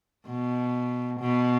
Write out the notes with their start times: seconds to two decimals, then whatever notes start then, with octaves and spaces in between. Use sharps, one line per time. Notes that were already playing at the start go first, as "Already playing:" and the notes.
0.27 B2
1.20 B2